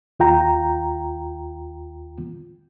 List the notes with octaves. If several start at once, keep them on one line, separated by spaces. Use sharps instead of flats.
D#2 F4 G5 A#5